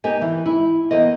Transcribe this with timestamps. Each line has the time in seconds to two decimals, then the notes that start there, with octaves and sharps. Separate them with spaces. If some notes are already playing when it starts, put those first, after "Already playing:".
0.04 A#3 D#4 G4 G#5
0.21 E3
0.46 E4
0.91 E2 A#3 D#5